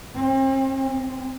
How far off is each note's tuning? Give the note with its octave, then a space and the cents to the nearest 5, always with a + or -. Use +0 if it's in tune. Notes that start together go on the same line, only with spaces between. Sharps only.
C4 +40
C4 -10